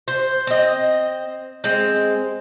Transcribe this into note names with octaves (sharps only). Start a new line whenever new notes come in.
C5
C4 D#5
G#3 C4